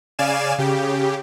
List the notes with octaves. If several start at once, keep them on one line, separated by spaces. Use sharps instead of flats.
C#3 D5 F5 G#5 E7
C#3 G4